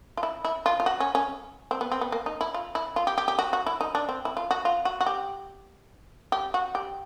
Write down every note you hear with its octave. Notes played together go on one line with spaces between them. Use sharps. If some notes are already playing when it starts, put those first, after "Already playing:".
F4
E4
E4
F4
F4
F#4
C#4
C#4
C4
B3
C4
B3
A#3
D#4
E4
F4
E4
F4
G4
G4
G4
F#4
F#4
E4
D#4
D4
C4
E4
F4
F#4
F4
F#4
F#4
G4
G4
F#4
G4